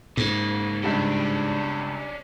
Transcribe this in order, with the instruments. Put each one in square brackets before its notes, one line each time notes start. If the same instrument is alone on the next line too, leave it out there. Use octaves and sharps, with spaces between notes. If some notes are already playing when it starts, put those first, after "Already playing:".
[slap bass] G#2 [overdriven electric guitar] C#3 A#3
[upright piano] C#2 G2 G3 [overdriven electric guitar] C#4 D4